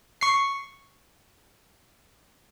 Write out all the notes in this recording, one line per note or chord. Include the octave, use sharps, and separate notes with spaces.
C#6 C7